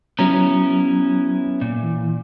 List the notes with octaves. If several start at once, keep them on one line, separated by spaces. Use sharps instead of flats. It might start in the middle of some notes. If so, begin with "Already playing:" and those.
F#3 B3 C#4 E4 A#5
A#2
E3